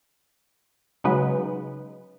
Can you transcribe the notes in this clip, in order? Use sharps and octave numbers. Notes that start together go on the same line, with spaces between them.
C#3 F#3 G#3 D#4 B4